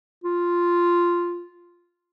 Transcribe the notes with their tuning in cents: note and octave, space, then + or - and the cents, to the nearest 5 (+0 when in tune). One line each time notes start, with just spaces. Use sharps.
F4 -5